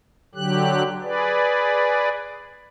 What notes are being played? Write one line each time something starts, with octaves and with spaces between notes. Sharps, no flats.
D3 F#3 G4 F#6
G#4 B4 D5